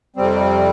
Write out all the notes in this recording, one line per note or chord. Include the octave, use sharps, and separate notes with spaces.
F2 C3 G3 C4